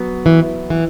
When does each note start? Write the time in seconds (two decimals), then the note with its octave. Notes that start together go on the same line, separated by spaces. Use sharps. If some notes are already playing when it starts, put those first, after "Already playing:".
Already playing: F#3 B3
0.26 E3
0.70 E3